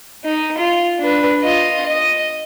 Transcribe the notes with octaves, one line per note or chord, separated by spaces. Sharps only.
D#4
F4
D4 B4
F4 D#5
D#5